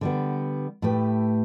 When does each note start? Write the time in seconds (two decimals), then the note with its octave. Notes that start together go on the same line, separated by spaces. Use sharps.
0.01 D3 G3 B3
0.82 A2 A3 G4 B4